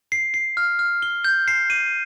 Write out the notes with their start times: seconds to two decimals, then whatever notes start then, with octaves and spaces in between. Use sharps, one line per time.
0.12 C7
0.34 C7
0.57 F6
0.79 F6
1.02 G7
1.24 G6
1.48 C7
1.70 D#7